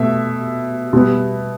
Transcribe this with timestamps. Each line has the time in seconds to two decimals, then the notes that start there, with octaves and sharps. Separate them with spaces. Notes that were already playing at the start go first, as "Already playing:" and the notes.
Already playing: B2 A3 E5
0.93 B2 G3 B3